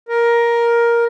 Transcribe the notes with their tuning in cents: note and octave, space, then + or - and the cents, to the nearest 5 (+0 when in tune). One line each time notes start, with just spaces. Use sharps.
A#4 +10